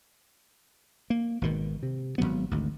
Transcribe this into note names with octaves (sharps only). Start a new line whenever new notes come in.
A#3
G#1 B2 D#3
C3
G#1 F#2 F#3 B3
G#1 D2